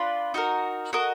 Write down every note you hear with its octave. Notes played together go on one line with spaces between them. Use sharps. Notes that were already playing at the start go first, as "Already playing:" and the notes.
Already playing: D4 F4 B4 D5
D#4 F#4 A#4
F#4 A#4 D#5